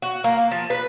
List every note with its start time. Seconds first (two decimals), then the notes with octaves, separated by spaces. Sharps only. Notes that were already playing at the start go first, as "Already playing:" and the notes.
0.02 F#4
0.24 A#3
0.51 F3
0.70 B4